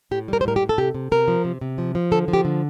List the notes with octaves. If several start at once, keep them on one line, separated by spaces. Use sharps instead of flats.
A2 G4
G3 A#4
C5
A2 A#4
G4
A2
A4
C3 G4
C3
C3 A#4
F3
C3
C3
F3
F3
D3 A4
F3
G4
D3